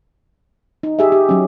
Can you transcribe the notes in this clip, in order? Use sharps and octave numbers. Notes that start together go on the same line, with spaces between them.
D#4
G4 G#4 E5
G4
F#3 C#4